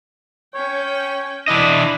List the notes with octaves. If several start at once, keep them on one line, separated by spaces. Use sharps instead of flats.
C#4 C#5 G5
E3 D4 E4 D5 D#5